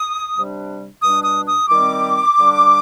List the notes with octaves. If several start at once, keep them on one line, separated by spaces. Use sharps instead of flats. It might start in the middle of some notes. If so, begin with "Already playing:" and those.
Already playing: D#6
C3 G3 D4
B2 G3 D4 D#6
D#6
D#6
D#3 G3 C4 D#4 D6
D3 G3 D4